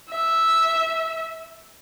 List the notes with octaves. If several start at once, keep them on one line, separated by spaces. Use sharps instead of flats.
E5